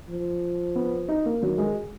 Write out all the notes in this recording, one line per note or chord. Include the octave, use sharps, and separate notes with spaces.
F3
B3
D#4
A#3
D#3 F#3
G#3